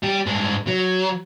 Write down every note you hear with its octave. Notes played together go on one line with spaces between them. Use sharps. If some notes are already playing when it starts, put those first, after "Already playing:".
G3 G4
G2 G#3
F#3